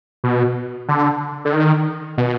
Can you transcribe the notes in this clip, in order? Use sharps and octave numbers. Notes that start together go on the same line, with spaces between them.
B2
D3
D3
D#3
B2